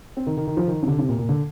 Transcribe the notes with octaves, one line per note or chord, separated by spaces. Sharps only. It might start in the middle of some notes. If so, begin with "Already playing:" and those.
C4
D#3
D#3
D#3
F3
D#3
C3
D3
C3
A#2
A#2
D3